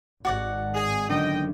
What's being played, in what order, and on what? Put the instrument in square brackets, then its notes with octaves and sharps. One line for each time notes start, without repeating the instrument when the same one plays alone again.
[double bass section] G#1 [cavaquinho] F#4 D5 F#5
[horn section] G#4
[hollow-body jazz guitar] F#2 D3 D#3 [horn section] D#5 G5